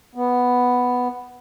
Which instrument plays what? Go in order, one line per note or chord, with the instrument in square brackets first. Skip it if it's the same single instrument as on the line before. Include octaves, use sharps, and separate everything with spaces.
[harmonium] B3